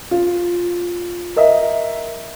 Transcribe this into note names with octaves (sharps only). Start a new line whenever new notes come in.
F4
A#4 D#5 E5